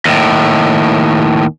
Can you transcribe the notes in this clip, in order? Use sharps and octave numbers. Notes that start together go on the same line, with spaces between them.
D#2 A2